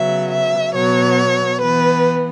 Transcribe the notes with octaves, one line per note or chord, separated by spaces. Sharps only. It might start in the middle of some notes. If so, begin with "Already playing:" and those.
Already playing: C#3 F#3 B3 E5
E5
B2 F#3 B3 C#5
E3 B3 B4